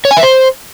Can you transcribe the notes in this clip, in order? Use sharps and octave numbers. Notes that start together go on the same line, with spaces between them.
C#5
G#5
E5
C5